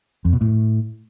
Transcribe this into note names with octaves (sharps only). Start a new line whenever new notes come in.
F2
B2
A2